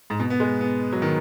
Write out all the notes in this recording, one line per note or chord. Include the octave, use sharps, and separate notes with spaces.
G#2
B2
B3
G#3
B3
F#3
D#3